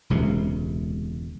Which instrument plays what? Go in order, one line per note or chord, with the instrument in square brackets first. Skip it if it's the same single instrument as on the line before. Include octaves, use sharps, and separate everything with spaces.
[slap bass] E1 C#2 C3